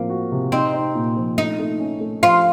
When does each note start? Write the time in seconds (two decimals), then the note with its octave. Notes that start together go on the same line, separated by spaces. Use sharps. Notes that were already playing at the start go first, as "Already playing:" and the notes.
Already playing: A2 F3 A#3 C4
0.10 F#4
0.32 C3
0.52 C4 D#4
0.73 D#4
0.95 A#2
1.17 F3
1.37 A3 D#4
1.59 A3
1.80 C#4
2.00 A3
2.23 F3 F4